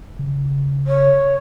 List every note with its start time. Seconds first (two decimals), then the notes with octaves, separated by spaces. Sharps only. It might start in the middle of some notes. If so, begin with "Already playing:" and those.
0.19 C#3
0.87 C#5